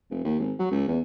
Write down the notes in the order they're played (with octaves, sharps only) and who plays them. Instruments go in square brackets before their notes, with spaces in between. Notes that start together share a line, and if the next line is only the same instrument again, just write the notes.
[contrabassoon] F1
D#2
G#1
F#3
C#2
E2